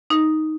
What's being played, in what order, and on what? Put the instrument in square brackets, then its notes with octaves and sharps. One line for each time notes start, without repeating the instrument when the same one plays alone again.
[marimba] D#4